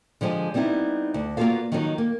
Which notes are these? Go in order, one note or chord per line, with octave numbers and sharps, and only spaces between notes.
D3 F3 G#3 G4
G3 B3 C4 D#4 E4
D2
A#3 B3 F4 F#4 A4 F5
D#3 F3 F#3 A#3 D4 D#4
A#3